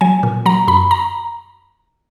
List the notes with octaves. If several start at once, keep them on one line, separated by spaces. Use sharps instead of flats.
F#3 G#5
A#2
F#3 A#5
F#2 B5
A#5